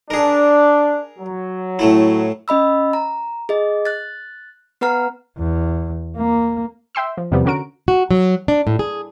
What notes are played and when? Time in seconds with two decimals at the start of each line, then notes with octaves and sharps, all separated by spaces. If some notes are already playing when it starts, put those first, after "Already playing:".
0.10 D4 G#4 A#4
1.19 F#3
1.79 A2 A3 E4
2.48 C#4 D#5 B5 E6
2.93 A#5
3.49 G#4 D#5
3.85 F#6 A6
4.81 B3 B4 F#5 A#5 F6
5.38 E2
6.17 A#3
6.95 E5 G5 C6 E6
7.17 F3
7.31 E2 C3 F3 G3 B3
7.45 D3 C#4 F#4 A#4 D7
7.88 F#4
8.11 F#3
8.48 D4
8.67 A2
8.79 G#4